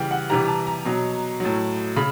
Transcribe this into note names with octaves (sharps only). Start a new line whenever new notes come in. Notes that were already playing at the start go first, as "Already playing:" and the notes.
Already playing: C#3 E3 G3 G5
F#5
C3 E3 G3 A#5
A5
A#5
B2 F#3
A2 F#3
C#3 B5